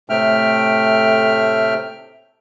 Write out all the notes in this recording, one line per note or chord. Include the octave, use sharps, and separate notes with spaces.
A2 C3 A3 E5 G5 F6